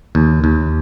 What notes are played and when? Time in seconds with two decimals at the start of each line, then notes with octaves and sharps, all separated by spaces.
0.15 D#2
0.44 D#2